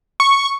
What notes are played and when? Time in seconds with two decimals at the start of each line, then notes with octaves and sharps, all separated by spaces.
0.20 C#6